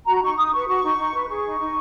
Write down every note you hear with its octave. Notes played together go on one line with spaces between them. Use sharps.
F#4 A#5
D#4 C#6
D#4 D#6
B4 C#6
F#4 C#6
D#4
D#4
B4
G#4 C#6
D#4
D#4